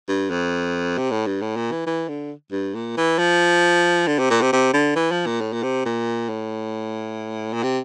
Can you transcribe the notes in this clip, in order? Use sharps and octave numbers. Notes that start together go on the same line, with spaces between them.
G2
F2
C3
A2
G2
A2
A#2
E3
E3
D3
G2
A#2
E3
F3
D3
C3
A#2
C3
C3
D3
E3
F3
A#2
A2
A#2
C3
A#2
A2
A#2
C3